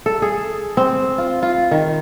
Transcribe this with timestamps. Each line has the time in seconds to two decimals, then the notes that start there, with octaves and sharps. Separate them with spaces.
0.06 A4
0.22 G#4
0.77 C4
1.18 F4
1.43 F4
1.71 D#3